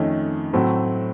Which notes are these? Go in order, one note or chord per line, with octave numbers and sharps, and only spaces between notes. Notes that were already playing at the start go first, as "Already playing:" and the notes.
Already playing: F2 D#3 A3 C#4
A2 F#3 A3 C4